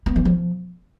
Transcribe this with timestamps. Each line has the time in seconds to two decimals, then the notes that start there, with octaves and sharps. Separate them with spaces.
0.06 B3
0.16 E3
0.25 F3